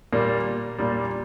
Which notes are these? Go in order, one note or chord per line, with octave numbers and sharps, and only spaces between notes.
A#2 G3 A#3
A#2 G3